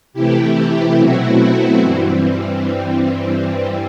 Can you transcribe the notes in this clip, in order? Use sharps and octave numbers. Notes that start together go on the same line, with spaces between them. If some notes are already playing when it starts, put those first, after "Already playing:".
C3 E3 A3 E4 G4
B2 F#3 A3 C4 E4 F#4
E4
G2 E3 G3 C4